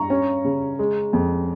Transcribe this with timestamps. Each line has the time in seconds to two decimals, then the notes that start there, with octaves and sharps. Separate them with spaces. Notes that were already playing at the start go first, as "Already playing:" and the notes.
Already playing: G2 A#5 C#6
0.10 C#4
0.45 C#3
0.79 G#3
1.13 F2